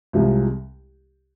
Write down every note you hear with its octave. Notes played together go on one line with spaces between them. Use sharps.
C2 C3 F3 G#3